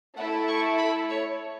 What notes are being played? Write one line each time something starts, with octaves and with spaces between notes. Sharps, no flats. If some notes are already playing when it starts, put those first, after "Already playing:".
A3 E4 A4 F#5
C#6
B5
C#5